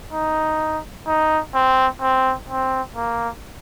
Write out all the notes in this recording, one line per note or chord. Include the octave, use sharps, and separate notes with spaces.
D#4
D#4
C4
C4
C4
A#3